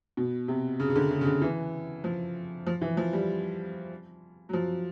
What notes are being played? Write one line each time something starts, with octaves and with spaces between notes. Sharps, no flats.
B2
C3
C#3
C#3
D3
C#3
C#3
D3
E3
F3
F3
E3
F3
G3
F#3
F3